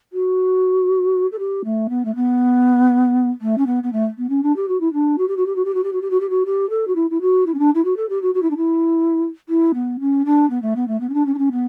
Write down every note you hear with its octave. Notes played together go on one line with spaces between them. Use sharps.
F#4
A4
G4
A3
B3
A3
B3
A3
C#4
B3
B3
A3
B3
C#4
D4
G4
F#4
E4
D4
F#4
G4
F#4
G4
F#4
G4
F#4
G4
F#4
G4
F#4
G4
F#4
G4
A4
F#4
E4
E4
F#4
E4
C#4
D4
E4
F#4
A4
G4
F#4
F#4
E4
D4
E4
E4
B3
C#4
D4
B3
A3
B3
A3
B3
C#4
D4
C#4
D4
C#4
B3